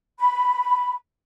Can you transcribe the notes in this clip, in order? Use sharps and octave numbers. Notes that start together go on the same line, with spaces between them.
B5